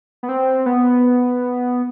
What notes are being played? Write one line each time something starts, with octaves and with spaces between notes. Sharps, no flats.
B3
C4
B3